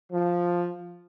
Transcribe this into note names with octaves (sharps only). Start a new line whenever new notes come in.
F3